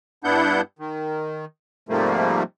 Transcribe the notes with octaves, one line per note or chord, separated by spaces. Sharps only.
G2 B3 D4 E4 F#5 G6
D#3
G#2 C3 F3 G3 A3 A#3